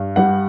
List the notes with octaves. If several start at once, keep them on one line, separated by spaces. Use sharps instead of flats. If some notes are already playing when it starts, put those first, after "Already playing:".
Already playing: G2
G3 F#5